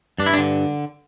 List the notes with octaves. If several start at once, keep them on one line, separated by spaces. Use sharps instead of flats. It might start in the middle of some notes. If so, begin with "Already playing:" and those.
G2 D4
E4
D4
D3